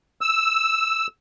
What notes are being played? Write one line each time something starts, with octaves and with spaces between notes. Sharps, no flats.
E6